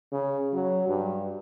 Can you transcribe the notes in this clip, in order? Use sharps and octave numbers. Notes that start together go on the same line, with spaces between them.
C#3
F#3
G2